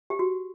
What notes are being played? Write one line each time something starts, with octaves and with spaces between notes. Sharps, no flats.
G4
F#4